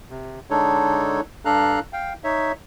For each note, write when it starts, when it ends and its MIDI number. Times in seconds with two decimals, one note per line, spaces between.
0.10 0.40 48
0.50 1.21 50
0.50 1.21 56
0.50 1.21 62
0.50 1.21 63
0.50 1.21 69
0.50 1.21 73
1.45 1.80 43
1.45 1.80 62
1.45 1.80 69
1.45 1.80 77
1.45 1.80 82
1.45 1.80 90
1.93 2.13 77
1.93 2.13 79
2.24 2.52 63
2.24 2.52 73
2.24 2.52 76